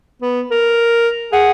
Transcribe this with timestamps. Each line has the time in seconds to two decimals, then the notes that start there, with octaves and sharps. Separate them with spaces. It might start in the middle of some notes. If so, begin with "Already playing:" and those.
0.22 B3
0.50 A#4
1.32 G#4 F#5